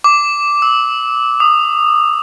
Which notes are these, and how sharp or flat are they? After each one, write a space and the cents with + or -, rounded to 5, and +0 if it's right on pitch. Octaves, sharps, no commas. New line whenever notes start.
D6 -5
E6 -30
D#6 -30